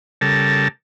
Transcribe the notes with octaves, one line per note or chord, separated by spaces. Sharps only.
C#3 G3 A4 A#4 A5